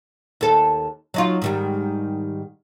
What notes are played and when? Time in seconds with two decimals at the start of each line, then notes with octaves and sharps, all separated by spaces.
0.41 D#2 A4
1.14 F#3 D#4 F4
1.42 G#2 D#3 G3